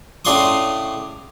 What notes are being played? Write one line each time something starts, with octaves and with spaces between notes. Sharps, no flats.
A2 C#3 D4 C6 C#6 D#6